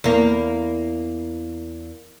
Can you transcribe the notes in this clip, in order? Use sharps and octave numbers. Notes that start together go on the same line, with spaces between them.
E2 A#3